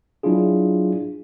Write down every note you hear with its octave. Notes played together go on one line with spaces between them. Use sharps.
F#3 D4 E4 F4 G#4